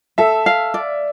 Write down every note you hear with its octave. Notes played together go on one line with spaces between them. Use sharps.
A4 E5
F5
D5